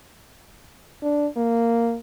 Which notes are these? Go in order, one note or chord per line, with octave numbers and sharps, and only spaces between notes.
D4
A#3